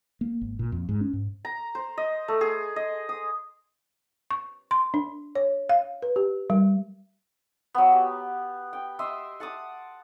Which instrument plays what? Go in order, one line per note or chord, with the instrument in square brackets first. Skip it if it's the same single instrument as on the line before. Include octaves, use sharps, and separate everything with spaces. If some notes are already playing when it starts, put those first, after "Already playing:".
[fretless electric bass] A#3
G#1
A#2
F2
G#2
C#4
G#2
[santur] A#5
C5
D#5
A3
G#4
D#5
D#6
[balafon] C#6
C6
D4
C#5
F5
B4
G4
G3
[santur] F#3 B3
G4
G5
D#5 E5 C6
F#5 A5 D6 D#6